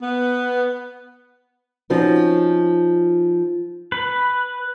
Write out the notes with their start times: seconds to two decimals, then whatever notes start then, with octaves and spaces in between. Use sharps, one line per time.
0.02 B3
1.90 F3 C4 C#4 D#4 F#4
3.92 B4